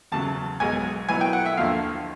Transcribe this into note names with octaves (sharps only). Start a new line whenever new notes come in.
E2 C#3 F#3 A5
B1 B2 G#3 G#5
B2 F#3 B3 E4 G#5
G5
F#5
E5
D#2 D3 F3 F5